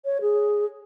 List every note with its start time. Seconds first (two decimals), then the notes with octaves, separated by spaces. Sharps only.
0.05 C#5
0.21 G#4